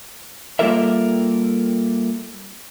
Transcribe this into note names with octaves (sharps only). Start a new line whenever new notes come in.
G3 A#3 F4 A4 A#4 E5